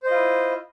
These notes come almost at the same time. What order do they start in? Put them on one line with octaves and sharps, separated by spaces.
C5 D#5 F4 E4